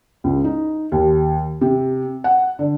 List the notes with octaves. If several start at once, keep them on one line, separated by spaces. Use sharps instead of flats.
C#2
D#4
D#2
C3
F#5
D3